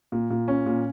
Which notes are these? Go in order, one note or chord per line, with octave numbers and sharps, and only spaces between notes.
A#2
A#2
C#4
A#2